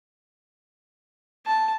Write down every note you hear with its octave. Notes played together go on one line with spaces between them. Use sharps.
A5